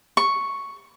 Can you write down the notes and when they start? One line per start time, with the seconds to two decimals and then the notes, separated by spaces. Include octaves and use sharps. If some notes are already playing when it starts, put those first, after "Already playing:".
0.17 C#6